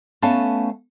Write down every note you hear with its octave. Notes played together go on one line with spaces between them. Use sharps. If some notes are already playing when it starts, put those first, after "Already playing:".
A3 B3 C#4 F5 A5